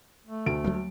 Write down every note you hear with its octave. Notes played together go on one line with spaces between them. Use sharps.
A3
D2 D7
F#3 G3 A#3